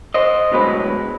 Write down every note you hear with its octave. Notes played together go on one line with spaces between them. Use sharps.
C5 D#5
D2 B2 F#3 G#3 B4